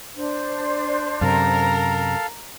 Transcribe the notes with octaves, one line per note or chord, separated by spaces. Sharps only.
D4 C5
F#2 C3 A4 A#4 F5